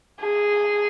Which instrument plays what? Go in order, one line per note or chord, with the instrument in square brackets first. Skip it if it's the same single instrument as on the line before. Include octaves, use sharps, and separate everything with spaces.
[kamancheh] G#4